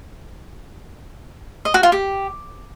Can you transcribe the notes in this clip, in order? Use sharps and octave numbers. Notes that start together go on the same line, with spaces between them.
D#5
F#4
F4
G4